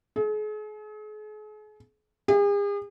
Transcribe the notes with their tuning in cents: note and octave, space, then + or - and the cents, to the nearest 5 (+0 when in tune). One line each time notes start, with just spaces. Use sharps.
G#4 +40
G#4 -45